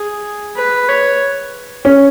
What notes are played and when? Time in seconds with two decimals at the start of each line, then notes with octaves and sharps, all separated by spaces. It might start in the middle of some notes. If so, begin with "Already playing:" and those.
Already playing: G#4
0.57 B4
0.89 C#5
1.85 C#4